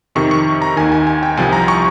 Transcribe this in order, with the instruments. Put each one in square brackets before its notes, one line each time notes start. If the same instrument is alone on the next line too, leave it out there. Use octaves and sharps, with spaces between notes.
[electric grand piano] F2 C3 D#3 C#6
C#6
A#5
D#2 D#3 G#5
G#5
G#5
G5
C2 C3 F3 G#5
A#5
C#6